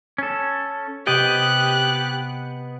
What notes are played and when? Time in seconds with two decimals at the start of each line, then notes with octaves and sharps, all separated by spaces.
0.18 C#4 A4
1.07 C3 B3 G4 D#5 G5 F#6